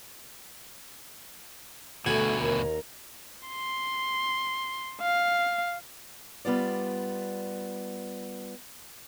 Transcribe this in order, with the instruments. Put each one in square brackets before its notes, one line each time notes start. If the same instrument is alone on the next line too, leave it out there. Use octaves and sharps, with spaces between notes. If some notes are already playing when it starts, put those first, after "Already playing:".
[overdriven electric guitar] D2 B2 [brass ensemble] A3 [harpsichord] F#4 G#5
[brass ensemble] D#2 [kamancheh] A#4
[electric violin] C6
F5
[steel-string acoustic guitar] G3 B3 F4 D5